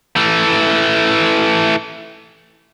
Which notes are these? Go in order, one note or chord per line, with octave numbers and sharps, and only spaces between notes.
E3 A3